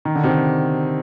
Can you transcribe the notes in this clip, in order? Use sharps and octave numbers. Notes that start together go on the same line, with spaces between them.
D#3
D3
C3 D#3